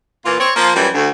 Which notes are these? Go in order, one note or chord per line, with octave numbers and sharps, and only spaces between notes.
A#2 E3 F4
C4 C#5
F3 A#3
F#2 E3 F3 G3
D2